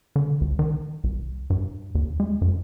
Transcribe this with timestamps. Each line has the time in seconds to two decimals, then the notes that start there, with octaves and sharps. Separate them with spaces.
0.16 D3
0.41 C#2
0.59 D#3
1.04 C2
1.50 G2
1.95 D#2
2.20 G#3
2.42 F#2